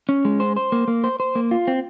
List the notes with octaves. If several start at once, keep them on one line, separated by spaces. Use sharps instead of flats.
C#4
G#3
C5
C5
A#3
A#3
C5
C5
A#3
F4
C4